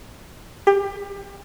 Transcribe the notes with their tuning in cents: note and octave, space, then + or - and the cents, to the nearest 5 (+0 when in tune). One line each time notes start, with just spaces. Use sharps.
G4 +25